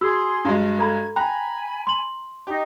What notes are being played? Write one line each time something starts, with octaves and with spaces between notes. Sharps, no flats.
F#4 G#4 C6 E6
G2 F#3 G#3
A4 A#5 B5 G#6
G5 G#5 A#5 B5 F#6
C6 F#7
D#4 G4